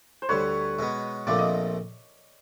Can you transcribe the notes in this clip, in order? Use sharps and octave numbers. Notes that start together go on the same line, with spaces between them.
C5
D2 D3 G3 B4 C#5
B2 G#3 B3
A#1 A#2 F3 A3 C4 D5
D#5